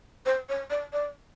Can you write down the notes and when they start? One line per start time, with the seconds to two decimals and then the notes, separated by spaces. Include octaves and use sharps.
0.26 C5
0.49 C#5
0.70 D5
0.93 D5